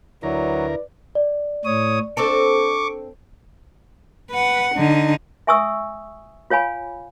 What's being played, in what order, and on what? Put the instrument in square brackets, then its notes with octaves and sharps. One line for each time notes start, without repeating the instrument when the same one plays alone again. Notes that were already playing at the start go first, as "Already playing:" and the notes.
[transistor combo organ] D2 A#4 [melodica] F#3 [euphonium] E4 [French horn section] B4 D5
[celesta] D5
[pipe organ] A2 C#5 D#6
[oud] C4 D4 A4 [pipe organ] C#6 D6
[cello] B4 F#5
D3 D#4
[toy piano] E5 G#5 C#6 D#6 E6
F4 C#5 F5 G#5 B5